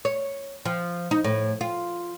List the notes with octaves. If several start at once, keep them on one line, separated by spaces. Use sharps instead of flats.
C#5
F3
D#4
A2
F4